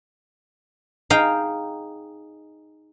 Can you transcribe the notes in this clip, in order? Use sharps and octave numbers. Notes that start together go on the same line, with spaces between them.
D#4 G#4 F5 G5